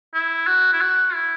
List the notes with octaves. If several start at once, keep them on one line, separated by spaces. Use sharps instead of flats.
E4
F#4
E4
F#4
E4